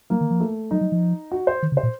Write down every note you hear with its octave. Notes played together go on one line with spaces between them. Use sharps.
F#3 A#3
D#3
F3
A3
F#3 D#4
F#3
F3
F#4
C5
D#3
C#3
C5
A#2